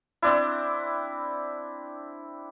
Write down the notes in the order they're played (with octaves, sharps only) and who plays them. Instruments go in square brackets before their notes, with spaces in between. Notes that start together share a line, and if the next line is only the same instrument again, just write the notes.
[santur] C4 D4 E4